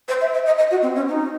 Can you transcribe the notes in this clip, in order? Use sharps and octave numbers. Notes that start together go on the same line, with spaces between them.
C5
E5
E5
D#5
D#5
F#4
C4
C#4
D#4